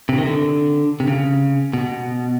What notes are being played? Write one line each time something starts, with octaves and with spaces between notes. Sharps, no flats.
C3
D#3
D3
C3
C#3
B2